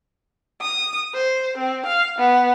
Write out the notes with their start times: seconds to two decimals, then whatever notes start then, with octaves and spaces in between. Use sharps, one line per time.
0.61 D#6
1.14 C5
1.58 C4
1.86 F5
2.19 B3